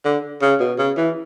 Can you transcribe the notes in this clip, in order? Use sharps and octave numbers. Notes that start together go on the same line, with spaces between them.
D3
C#3
B2
C#3
E3